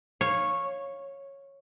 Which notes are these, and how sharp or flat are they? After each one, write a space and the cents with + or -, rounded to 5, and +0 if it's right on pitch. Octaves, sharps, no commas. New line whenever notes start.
C#5 -10 F5 +0